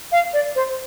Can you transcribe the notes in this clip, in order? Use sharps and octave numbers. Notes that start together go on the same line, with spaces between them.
F5
D5
C5